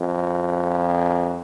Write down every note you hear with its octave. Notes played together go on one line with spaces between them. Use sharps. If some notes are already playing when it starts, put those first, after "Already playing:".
Already playing: F2